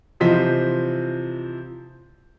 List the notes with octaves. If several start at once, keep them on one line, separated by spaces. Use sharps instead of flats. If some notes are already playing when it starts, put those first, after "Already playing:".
C3 E3 F3 C5 D#5 B6